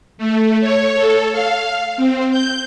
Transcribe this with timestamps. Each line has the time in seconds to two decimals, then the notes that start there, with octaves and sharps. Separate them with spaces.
0.18 A3
0.60 C#5
0.96 A4
1.32 F5
1.97 C4
2.31 G6